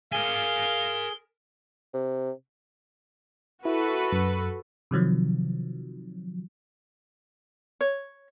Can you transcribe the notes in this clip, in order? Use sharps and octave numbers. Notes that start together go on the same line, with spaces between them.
G#4 A#4 F5 G#5 G7
C3
E4 F#4 A4 B4
F#2
C3 D#3 F3 F#3
C#5